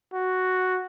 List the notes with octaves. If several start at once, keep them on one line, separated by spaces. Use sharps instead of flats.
F#4